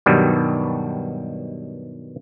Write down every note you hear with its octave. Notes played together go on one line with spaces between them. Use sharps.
G2 B2 D#3 F#3 G3